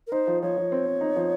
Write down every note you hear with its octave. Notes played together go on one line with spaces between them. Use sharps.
A#4
D#4 C5
F3
F3 C#5
F3
C4
C4
D#4
F3